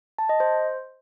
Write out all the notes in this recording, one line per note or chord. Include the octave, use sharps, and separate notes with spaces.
A5
D#5
C5